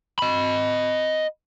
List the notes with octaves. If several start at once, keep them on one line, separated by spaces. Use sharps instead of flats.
D#5 B5